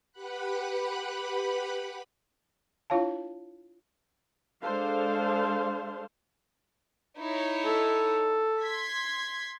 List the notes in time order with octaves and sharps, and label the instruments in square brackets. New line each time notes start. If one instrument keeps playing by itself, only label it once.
[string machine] G4 B4 F#5 B5 F#6
[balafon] D4 E4 F4 C#5 F5 A5
[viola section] G#3 D4 A4 C5 F5
[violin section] D#4 E4 C#5
[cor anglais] A4
[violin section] C6 G#6 B6